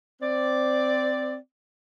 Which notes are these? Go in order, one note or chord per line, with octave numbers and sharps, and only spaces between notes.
C4 D5